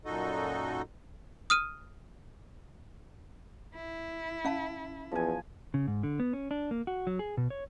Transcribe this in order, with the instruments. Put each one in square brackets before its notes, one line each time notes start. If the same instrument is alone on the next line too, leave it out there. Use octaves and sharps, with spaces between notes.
[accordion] F#2 A#2 D#4 F#4 A4 D#5
[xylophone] D#6 F6 D#7
[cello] E4
[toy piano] C#4 F5 A5
[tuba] E2 [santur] F3 G#5
[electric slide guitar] C#3
G#2
D3
B3
C#4
D4
A#3
F#4
F#3
G#4
B2
C#5